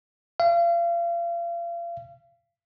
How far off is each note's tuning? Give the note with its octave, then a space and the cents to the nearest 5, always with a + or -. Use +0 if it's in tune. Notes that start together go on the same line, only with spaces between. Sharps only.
F5 -35